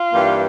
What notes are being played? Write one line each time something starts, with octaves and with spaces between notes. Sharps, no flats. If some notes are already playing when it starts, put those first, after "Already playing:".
Already playing: F4
G2 E3 G3 A#3